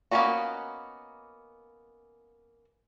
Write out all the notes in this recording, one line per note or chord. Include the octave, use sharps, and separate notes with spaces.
A#3 B3 C#4 D#4 F#4